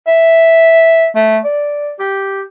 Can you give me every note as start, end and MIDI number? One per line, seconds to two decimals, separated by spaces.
0.07 1.07 76
1.15 1.39 57
1.44 1.93 74
1.99 2.42 67